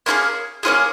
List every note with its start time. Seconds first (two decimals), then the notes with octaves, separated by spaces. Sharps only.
0.06 A#3 C#4 F4 G#4
0.63 A#3 C#4 F4 G#4